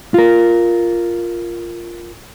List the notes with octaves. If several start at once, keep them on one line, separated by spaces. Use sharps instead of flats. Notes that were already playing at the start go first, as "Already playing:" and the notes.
F4 A#4